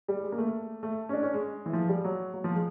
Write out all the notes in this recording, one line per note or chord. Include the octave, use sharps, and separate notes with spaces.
G3
G#3
A#3
A3
A3
C#4
D4
C#4
G#3
E3
F3
G3
F#3
F#3
F3
G#3